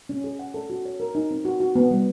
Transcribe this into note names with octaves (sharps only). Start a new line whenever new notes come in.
C#4
G#4
F#5
A4
F#4
C#5
A#4
D#4
C4
F#4
F#4
B3
G3